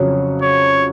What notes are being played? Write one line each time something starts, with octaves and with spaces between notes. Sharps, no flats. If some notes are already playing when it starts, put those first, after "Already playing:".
Already playing: F2 C#3 F#3 C#4
C#5